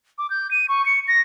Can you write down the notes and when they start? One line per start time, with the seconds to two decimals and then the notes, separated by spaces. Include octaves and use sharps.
0.18 D6
0.30 G6
0.51 D#7
0.69 C#6
0.86 C#7
1.08 A#6